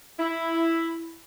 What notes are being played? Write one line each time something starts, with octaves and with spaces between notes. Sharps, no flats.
E4